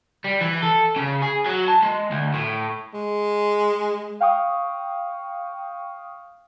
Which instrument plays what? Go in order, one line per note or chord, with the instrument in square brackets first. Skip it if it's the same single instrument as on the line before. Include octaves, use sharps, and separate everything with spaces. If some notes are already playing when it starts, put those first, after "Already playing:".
[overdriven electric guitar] G3
E3
A4
C#3
G#4
F#3
A5
G#3
D2
A2
[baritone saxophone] G#3
[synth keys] F5 G5 C#6 D#6